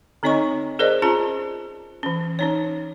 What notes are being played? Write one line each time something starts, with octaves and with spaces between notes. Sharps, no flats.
D3 C4 D#4 C#5 D#5 C#6
G#4 A#4 C5 D5 D#5
C#4 F4 G#4 A5 A#5
E3 C#4
C#4 D#4 C#5